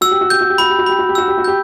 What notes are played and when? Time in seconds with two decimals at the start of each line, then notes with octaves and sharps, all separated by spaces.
0.01 F#4 E6
0.11 G4
0.21 F#4
0.30 G4 G6
0.41 F#4
0.50 G4
0.58 F#4 B5
0.70 G4
0.79 F#4
0.86 G4 B5
0.99 F#4
1.09 G4
1.15 F#4 E6
1.28 G4
1.38 F#4
1.44 G4 G6